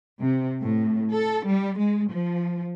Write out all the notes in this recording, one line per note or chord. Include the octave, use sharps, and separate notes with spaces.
C3
A2
A4
G3
G#3
F3